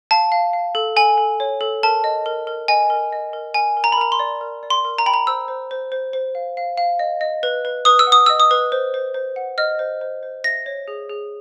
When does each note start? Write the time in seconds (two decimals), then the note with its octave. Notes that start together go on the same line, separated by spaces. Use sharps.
0.11 F5 A5
0.32 F5
0.53 F5
0.75 A4
0.96 A4 G#5
1.18 A4
1.40 C#5
1.61 A4
1.83 A#4 A5
2.04 D#5
2.26 A#4
2.47 A#4
2.68 D#5 G#5
2.90 A#4
3.13 D#5
3.33 A#4
3.54 A#4 G#5
3.77 A#4
3.84 A#5
3.92 B5
3.98 A#4 A#5
4.12 C6
4.19 D5
4.41 A#4
4.63 D5
4.70 C6
4.85 A#4
4.98 A#5
5.06 G5 B5
5.14 A#5
5.27 C5 E6
5.48 C5
5.71 C5
5.92 C5
6.13 C5
6.35 F5
6.57 F5
6.77 F5
6.99 D#5
7.21 D#5
7.43 B4
7.65 B4
7.85 B4 D#6
7.99 E6
8.07 F#5
8.12 D#6
8.26 D#5 E6
8.40 D#6
8.51 B4
8.72 C5
8.94 C5
9.14 C5
9.36 F#5
9.58 D#5 F6
9.79 C5
10.01 C5
10.23 C5
10.44 E5 A#6
10.66 C#5
10.88 G#4
11.09 G#4